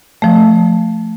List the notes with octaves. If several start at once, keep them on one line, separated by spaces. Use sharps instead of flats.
F3 A3